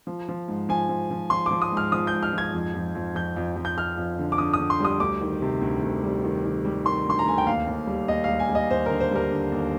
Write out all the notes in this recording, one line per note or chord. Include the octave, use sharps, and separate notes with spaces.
F3
F3
G#2
F3 G#5
F3
F3
F3 C6
F3 D6
D#6
G#2
F6
F3 D#6
G6
G#2
F6
F3 G#6
F2
F2
F2
F2 G6
F2
F2
G6
F2 F6
F2
D3
D6
D3 D#6
D#6
D3
C6
G3 D#6
D2 D6
D#3
C3
D2
D2
G3
D#3
D#3
G3
D#3 C6
D2 C6
A#5
D2 G#5
G5
D#2 F5
D#2
G3
D#2 D#5
G3 F5
G#5
G3
D#5
D#2 C5
D3 A#4
C5
G3 A#4
D3
D#2